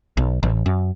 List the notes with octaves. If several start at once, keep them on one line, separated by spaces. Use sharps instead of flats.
B1
A1
F#2